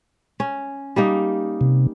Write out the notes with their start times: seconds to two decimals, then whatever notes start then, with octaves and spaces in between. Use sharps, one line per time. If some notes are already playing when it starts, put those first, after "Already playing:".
0.40 C#4
0.96 G3 A#3 D#4
1.61 C3